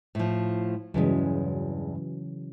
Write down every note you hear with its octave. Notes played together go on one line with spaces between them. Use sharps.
A2 F3
E2 G2 C#3 E3 F#3 G#3